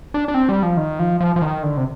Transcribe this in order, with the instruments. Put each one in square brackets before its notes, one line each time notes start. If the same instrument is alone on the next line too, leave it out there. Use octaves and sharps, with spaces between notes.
[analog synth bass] D4
D4
C4
G3
F3
D#3
F3
F3
F3
D#3
D3
C3